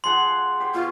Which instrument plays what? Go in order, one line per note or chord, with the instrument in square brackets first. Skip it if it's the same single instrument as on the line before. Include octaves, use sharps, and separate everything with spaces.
[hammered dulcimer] F3 G#4 F#5 [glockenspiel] C6
[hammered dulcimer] G4 C5
[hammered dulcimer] B2 C#5 [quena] F4